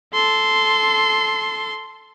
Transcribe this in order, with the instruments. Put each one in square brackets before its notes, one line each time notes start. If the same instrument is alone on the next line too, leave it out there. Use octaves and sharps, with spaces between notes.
[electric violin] A4 C6